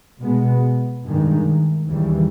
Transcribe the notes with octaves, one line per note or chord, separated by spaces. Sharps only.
B2 G#3 B3
G2 D#3 G#3
D#2 C#3 E3 G3